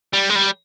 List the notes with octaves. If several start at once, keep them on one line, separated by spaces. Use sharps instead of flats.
G3
G#3
G3